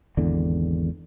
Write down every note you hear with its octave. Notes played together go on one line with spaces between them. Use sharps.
G#1 E2 D3